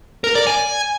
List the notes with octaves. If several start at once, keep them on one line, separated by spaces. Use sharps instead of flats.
A#4
D5
G#5